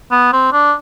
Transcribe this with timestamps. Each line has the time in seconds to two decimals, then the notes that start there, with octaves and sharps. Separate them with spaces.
0.11 B3
0.33 C4
0.52 D4